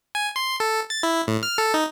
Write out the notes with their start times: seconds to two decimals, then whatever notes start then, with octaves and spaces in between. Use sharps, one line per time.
0.15 G#5
0.36 C6
0.60 A4
0.90 A6
1.03 E4
1.27 A2
1.43 F6
1.58 A4
1.74 D#4